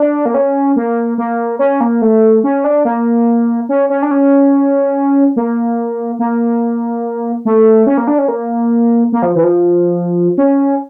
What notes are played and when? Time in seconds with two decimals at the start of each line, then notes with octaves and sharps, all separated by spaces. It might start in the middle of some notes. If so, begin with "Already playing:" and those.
Already playing: D4
0.26 A#3
0.34 C#4
0.76 A#3
1.18 A#3
1.59 C#4
1.81 A#3
2.02 A3
2.44 C#4
2.64 D4
2.85 A#3
3.69 C#4
3.90 C#4
4.02 D4
4.11 C#4
5.36 A#3
6.19 A#3
7.45 A3
7.87 C#4
7.97 A#3
8.07 D4
8.18 C#4
8.28 A#3
9.12 A#3
9.22 F3
9.35 E3
9.44 F3
10.38 C#4